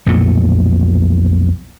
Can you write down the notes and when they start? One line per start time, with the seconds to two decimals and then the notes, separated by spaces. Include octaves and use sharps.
0.06 B1 F2 A#2 A3